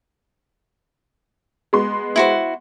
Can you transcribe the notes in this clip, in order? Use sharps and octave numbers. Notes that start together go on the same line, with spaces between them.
G#3 B3 C6
E4 F#4 C5